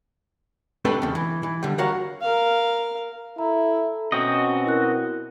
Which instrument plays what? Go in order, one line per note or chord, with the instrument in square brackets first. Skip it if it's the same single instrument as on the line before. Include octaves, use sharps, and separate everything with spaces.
[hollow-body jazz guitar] A3 C4 D4 G4 A4 B4
E2 C#3
E3
E3
D3 G3
F#4 A#4 C#5 F5 F#5
[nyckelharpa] A#4 F5
[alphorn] E4 [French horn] A4 [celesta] A#5
[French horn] B2 [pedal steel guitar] C4 F#4 D#5 [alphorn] C#4
[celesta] E4 A#4 F#6